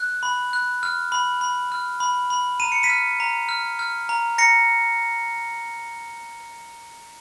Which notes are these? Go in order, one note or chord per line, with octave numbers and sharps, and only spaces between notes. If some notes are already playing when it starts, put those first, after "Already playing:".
Already playing: F#6
B5
F#6
F6
B5
B5
F6
B5
B5
A#5 D#7
C#7
B6 D#7
F6
A#5
F6
F6
A#5
A#5 A#6 C#7